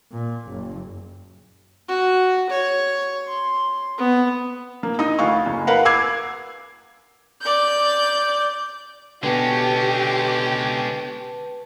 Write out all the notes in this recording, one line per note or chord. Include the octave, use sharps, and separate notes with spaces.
A#2
F#1
F#4
C#5
C6
B3
A#3
D#4 D#6
D2 F5 C#6
F#1
A#4 B4 F5 F#5 B5
D6 E6 G#6 C7
D5 G6
B2 D3 G#3 C#4 G4 B4 A5